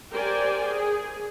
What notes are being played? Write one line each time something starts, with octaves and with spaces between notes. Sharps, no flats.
G4 A#4 C5 D5 G5 G#5
G#4